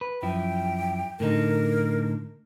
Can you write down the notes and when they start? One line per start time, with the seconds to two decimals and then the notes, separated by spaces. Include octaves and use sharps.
0.01 B4
0.23 F#2 F3 E4 G5
1.20 A2 D3 D#4 A#4